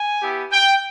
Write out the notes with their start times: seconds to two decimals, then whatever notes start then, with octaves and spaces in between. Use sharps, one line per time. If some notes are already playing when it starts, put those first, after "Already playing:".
Already playing: G#5
0.21 B3 E4 G4
0.52 G5